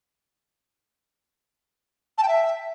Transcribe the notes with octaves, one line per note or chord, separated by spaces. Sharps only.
A5
G5
E5